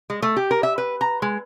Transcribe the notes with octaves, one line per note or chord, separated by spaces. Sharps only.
G#3
A3
G4
A#4
E5
B4
A#5
G#3